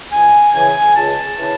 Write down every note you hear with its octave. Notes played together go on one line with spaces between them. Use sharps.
C#2 G#5
C#3 E3 G#5
C#2 A5
C#3 E3